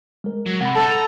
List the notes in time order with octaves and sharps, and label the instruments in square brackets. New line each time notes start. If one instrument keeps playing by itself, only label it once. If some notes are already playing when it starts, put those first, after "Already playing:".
[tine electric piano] G#3 A#4
[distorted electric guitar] F#3
[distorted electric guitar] C3 [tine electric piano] F#5 B5
[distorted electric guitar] G#3 D#4 [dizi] A4 [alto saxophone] A5
[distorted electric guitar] A#5